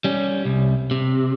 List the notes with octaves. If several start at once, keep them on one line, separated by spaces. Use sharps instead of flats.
G3 C#4
C2
C3